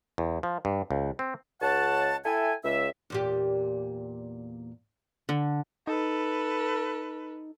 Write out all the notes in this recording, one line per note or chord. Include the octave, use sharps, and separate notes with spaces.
E2
F3
G2
C#2
C4
C#2 C#5 F#5 A5
E4 A4 E5 G5 G#5
C#2 E5
E2 A#2 G4
D3
D#4 A4 B4